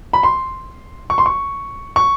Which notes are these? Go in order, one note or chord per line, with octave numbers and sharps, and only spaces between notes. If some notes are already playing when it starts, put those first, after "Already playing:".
B5
C6
C#6
C6
C#6
C#6